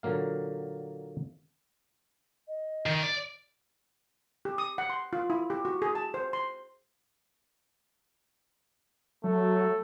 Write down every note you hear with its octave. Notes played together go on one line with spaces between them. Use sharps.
A#2 D3 F#3 A#3 F5
D#5
D#3
D5
G4
D#6
F#5
C6
F4
E4
G4
F#4
G#4
A5
C5
C6
F#3 A3